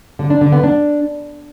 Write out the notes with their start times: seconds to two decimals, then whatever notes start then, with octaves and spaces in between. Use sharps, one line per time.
0.19 D3
0.30 D4
0.41 D3
0.52 B3
0.63 D4